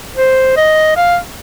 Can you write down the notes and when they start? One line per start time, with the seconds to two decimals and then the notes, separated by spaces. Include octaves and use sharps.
0.16 C5
0.57 D#5
0.96 F5